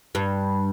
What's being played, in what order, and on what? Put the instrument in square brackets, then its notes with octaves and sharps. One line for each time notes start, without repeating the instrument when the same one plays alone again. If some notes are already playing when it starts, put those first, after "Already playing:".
[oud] G2